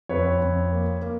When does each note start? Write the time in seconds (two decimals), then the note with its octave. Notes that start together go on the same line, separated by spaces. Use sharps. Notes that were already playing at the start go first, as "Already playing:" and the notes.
0.09 F2 B4 C#5
0.41 F2
0.72 A#3
1.02 A#3